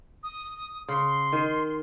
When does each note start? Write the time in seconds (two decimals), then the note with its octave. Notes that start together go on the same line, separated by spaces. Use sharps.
0.23 D#6
0.88 C#3 C6
1.33 D#3